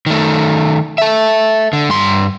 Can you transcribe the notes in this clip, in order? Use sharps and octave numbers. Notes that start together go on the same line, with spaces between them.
D#3 A3
A4 E5
D3
G2 C6